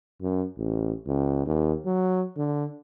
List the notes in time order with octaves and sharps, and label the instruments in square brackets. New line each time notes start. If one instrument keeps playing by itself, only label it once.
[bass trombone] F#2
A1
C#2
D#2
F#3
D3